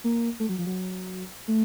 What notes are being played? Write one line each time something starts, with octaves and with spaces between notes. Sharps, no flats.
A#3
A3
F#3
F3
F#3
A3